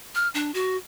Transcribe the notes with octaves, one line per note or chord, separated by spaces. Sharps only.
F6
D4
F#4